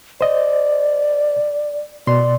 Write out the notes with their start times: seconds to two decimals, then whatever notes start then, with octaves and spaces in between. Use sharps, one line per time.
0.21 C5 D5 D#5
2.07 B2 D5 C6